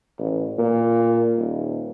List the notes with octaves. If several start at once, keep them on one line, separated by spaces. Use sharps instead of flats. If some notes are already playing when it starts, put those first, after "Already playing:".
A1
A#2
D#1